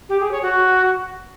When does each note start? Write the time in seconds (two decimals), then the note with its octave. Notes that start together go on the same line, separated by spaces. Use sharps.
0.09 G4
0.20 G#4
0.31 C#5
0.42 F#4